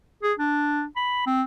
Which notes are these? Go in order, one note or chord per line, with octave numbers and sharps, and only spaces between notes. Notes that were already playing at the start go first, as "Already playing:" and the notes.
G#4
D4
B5
C4